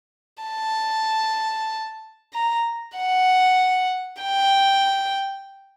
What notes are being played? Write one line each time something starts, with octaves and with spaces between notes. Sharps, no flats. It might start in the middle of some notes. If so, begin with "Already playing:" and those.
A5
A#5
F#5
G5